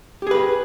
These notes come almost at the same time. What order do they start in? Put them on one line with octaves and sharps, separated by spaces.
G4 G#4 B4